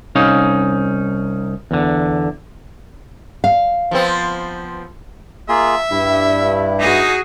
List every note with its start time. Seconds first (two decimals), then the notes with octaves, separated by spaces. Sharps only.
0.15 C2 C#4 D#4 F5
1.71 E2 D3
3.44 F5
3.91 F3 B3 C4
5.49 A#3 F4 G#4 E5
5.91 G2 E4
6.80 D#4 F#4 G#4